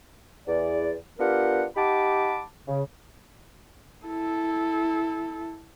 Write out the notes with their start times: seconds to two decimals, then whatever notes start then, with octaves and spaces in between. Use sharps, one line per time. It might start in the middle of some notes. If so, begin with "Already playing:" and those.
0.48 E2 D5
1.20 B3 D4 F4 G4 A#4 F#5
1.77 D#4 G4 F#5 A5 B5 D6
2.67 C#3
4.06 E4 A4